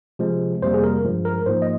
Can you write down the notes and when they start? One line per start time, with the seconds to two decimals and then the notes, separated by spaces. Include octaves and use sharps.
0.19 C3 F3 G#3
0.62 F2 C3 G3 A#3 C5
0.74 G#4
0.83 A#4
1.05 G2 F3 G#3
1.25 A#4
1.46 G#2 F3 A#3 C5
1.62 D#5